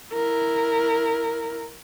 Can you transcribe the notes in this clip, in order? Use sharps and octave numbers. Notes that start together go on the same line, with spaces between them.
E4 A#4